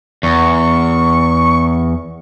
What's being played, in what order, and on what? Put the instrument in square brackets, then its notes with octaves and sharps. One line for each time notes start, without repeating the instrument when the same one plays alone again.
[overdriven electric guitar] E2 [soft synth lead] C#6